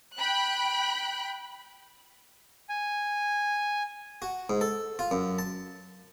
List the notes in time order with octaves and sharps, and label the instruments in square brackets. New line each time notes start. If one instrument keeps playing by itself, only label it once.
[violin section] G5 B5 F#6
[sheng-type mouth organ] G#5
[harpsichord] F#4
G#2
A4
F4
F#2
A5